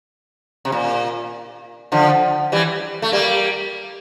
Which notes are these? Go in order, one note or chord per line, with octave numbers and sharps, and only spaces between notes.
C3
A#2
D3 F3
E3 G3
A3
G3 A#3